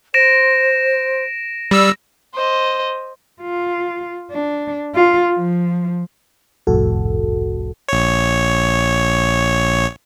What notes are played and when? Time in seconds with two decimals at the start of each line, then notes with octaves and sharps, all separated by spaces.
0.14 C5 A#6 D7 E7
1.71 G3 E6
2.34 C5 D#5
3.42 F4
4.31 D4
4.95 F4
5.35 F3
6.67 G1 C2 F2 A2 F#4 A4
7.89 A#1 C#5